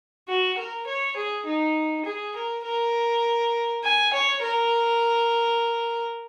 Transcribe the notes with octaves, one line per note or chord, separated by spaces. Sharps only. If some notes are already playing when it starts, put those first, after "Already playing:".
F#4
A#4
C#5
G#4
D#4
G#4
A#4
A#4
G#5
C#5
A#4